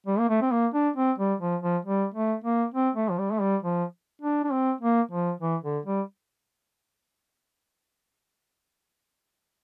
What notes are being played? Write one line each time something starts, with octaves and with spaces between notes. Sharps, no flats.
G3
A#3
A3
C4
A#3
D4
C4
G3
F3
F3
G3
A3
A#3
C4
A3
F3
G3
A3
G3
F3
D4
D4
C4
A#3
F3
E3
D3
G3